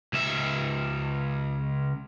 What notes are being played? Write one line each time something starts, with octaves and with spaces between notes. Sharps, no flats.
C#2 E5